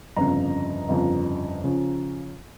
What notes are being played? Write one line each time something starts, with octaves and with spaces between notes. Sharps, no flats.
G1 F2 C#3 F3 A#5
G1 F2 C#3 F3
C#3 F3